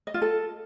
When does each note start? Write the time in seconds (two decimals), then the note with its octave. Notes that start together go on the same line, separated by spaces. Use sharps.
0.07 D#5
0.14 F4
0.22 A4